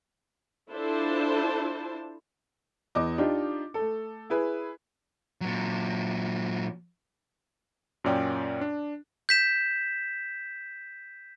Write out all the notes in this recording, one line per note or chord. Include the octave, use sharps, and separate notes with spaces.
D4 E4 F4 A4 C5 A5
E2 D#5 D6
D4 D#4 F4 G4
A3 A4
E4 G#4 B4
A#2 F#3
F#2 A#2 C#4 D5 G5
D4
G6 B6 E7